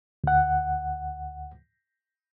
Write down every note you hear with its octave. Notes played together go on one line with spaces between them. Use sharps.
D2 F#5